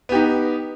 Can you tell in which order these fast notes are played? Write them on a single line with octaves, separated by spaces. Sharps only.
B3 G4 D#4